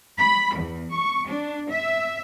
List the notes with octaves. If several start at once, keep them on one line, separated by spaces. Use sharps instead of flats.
B5
E2
C#6
D4
E5